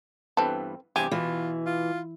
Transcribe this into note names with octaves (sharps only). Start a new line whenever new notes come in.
G2 E3 B3 C4 A4
E2 G2 C3 G4 G#5
B2 E3 F4
F4